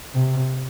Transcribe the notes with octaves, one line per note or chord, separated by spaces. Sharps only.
C3